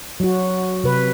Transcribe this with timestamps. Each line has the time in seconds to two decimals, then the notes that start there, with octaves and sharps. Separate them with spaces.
0.20 F#3 F#4
0.84 C3 B4